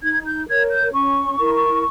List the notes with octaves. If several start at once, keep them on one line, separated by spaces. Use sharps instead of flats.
D#4 G#6
G6
A#4 C#5 G#6
G6
C#4 C#6
E4 A#4